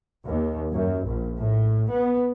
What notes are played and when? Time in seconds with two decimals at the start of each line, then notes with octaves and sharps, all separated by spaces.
0.25 D#2
0.73 F#2
1.05 A#1
1.37 A2
1.90 B3